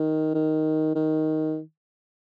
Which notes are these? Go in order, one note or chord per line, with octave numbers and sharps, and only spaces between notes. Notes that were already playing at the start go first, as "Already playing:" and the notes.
Already playing: D#3
D#3
D#3